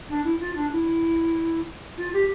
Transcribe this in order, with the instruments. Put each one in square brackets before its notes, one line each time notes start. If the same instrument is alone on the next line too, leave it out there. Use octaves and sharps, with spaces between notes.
[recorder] D4
E4
F4
D4
E4
F4
G4